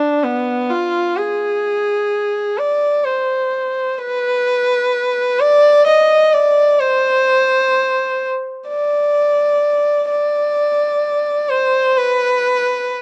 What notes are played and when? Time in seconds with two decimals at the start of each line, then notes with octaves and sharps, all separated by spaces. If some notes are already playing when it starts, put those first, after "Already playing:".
Already playing: D4
0.24 B3
0.70 F4
1.17 G#4
2.58 D5
3.05 C5
3.99 B4
5.40 D5
5.87 D#5
6.33 D5
6.80 C5
8.69 D5
10.09 D5
11.50 C5
11.97 B4